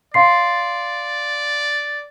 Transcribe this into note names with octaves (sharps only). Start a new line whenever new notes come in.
D5 F5 C6 C7